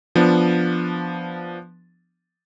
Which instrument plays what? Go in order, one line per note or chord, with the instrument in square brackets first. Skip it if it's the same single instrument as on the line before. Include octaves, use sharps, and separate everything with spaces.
[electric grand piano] F3 B3 D4